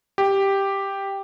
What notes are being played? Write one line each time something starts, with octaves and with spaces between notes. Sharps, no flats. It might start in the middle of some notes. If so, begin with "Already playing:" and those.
G4